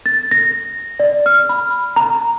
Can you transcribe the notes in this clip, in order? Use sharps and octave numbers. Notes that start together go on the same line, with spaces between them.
A6
A#6
D5
F6
B5
A#5